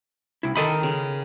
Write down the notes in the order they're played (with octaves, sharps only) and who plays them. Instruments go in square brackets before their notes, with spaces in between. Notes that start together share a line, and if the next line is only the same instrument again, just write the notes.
[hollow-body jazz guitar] C2 E4
[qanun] D#3 A#4 G5 [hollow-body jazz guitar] A4 D#5 B5
[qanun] C#3